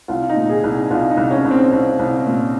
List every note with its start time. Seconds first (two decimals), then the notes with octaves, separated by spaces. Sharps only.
0.08 C2 F4
0.29 D#4
0.36 A#2
0.49 G#4
0.63 C2
0.90 C2 F4
1.11 D#4
1.17 C2
1.31 C#4
1.44 C2
1.51 C4
1.73 C2
1.99 C2
2.27 A#2